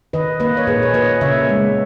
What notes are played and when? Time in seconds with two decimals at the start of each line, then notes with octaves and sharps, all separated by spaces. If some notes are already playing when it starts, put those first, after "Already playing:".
0.13 D#3 B4 D#5
0.40 A#3 B4 D#5
0.57 C#5
0.67 A#2 G#4 B4
0.83 C#5
0.94 A#3 B4 D#5
1.21 C#3 C#5 E5
1.49 G#3 B3